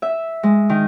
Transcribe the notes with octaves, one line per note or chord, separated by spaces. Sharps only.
E5
G#3
D#3